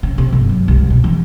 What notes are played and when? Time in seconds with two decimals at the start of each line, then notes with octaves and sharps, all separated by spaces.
0.03 C#3
0.18 C3
0.32 G1
0.49 F#2
0.68 C2
0.90 B2
1.04 E3